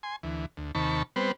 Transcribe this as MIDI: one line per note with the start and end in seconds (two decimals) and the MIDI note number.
0.03 0.16 80
0.03 0.16 84
0.23 0.46 38
0.23 0.46 52
0.57 0.72 38
0.75 1.03 39
0.75 1.03 48
0.75 1.03 51
0.75 1.03 81
0.75 1.03 83
0.75 1.03 85
1.16 1.32 55
1.16 1.32 59
1.16 1.32 60
1.16 1.32 71
1.16 1.32 72